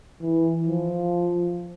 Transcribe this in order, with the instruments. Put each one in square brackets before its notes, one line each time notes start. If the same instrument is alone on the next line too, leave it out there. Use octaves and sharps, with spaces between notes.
[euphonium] E3
F3